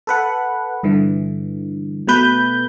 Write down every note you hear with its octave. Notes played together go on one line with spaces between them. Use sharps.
A4 B4 F#5
G2 D3 E3
B2 A3 B4 G6